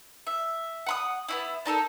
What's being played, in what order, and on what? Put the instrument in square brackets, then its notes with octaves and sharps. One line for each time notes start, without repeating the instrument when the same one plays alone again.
[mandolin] E5
F#5 B5 D#6
B3 C#4 E4
D4 D#4 A4 A#4